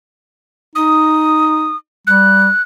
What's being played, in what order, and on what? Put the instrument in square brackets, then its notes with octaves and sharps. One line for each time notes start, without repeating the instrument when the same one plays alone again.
[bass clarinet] D#4 [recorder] D#6
[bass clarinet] G3 [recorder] F#6